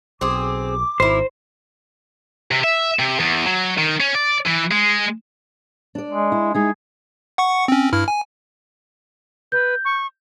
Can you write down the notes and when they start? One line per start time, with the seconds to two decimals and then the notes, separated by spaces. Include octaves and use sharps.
0.21 B1 C4 G#4 D6
1.00 G#1 E4 A#4 C5
2.51 C3
2.64 E5
2.99 C3
3.20 E2
3.46 F#3
3.78 D#3
4.00 C#4
4.15 D5
4.47 E3
4.72 G#3
5.95 D4 D5
6.10 G#3
6.32 E4
6.54 G#3 D#4 E4 G#4
7.38 F#5 C#6 C#7
7.68 C4 C#4
7.93 G2 E4 F6
8.08 G#5
9.52 B4 G6
9.85 C#6